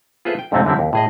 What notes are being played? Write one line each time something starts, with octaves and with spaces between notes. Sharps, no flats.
F4 G#4 A4 B4 C5 E5
G5
F2 G#2 C3 A3 C4 C#4
F#2 D3 G3 C4 E4
D#2
A2 G#4 D#5